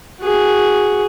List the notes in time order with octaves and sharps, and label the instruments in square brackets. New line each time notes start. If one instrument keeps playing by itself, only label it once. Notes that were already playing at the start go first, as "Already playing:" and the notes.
[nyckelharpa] F#4 G#4